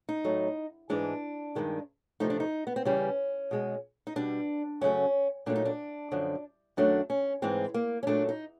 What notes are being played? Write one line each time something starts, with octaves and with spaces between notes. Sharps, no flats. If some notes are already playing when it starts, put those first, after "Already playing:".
D#4
A2 F#3 A3
G#2 E3 G#3 D4
G2 D#3 G#3
E2 C3 F3 A3 D#4
D4
D#4
B3
C4
E2 C#3 E3 G3 C#4
B2 G#3
D#4
B2 G3 D4
F#2 C#3 F#3 A3 C#4
A#2 F#3 A3 D4
D#4
D4
F#2 D3 F3
F#2 D#3 F#3 A3 D4
C#4
G#2 E3 G#3 C4
A#3
C#4
A#2 F#3 A3 D4
D#4